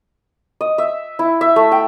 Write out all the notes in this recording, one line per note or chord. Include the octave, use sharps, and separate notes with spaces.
D#5
E5
E4
E5
A3
G5